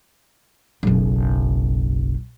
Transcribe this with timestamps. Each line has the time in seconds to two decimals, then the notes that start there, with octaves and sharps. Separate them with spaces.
0.83 F#1 B1